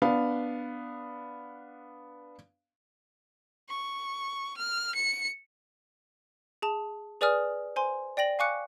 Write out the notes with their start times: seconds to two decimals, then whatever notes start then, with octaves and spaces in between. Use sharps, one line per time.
0.02 B3 D4 F5
3.69 C#6
4.57 F6
4.96 C#7
6.62 G#4 A5
7.21 G#4 B4 D5 G#5 D#6 F6
7.76 C5 G#5 C6
8.17 D5 G5 A#6 F#7
8.39 F5 G#5 C#6 D6 F#6 C#7